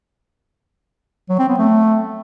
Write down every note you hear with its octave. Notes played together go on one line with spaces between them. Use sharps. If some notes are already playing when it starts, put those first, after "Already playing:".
F#3
C4
B3
A3